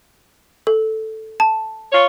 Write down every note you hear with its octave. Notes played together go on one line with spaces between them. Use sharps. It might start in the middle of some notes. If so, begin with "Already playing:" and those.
A4
A5
F4 C#5